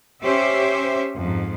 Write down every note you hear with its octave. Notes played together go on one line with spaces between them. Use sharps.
C#4 G4 C5 E5
F2 G#2